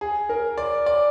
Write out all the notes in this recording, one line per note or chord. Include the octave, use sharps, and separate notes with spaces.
G#4
A#4
D5
D5